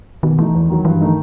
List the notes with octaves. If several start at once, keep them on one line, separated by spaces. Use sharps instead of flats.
B2 D#3
E3 A3 D#4
E2
D#3 F#3
G2 E3
D#3 A3 D#4